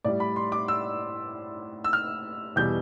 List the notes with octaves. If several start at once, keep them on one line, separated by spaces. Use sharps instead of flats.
A2 G3 D5
B5
C6
D6
E6
E6
F6
E2 B2 G3 G6